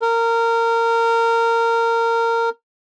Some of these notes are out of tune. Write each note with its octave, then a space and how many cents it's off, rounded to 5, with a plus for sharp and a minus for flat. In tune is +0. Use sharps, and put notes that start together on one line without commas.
A#4 -20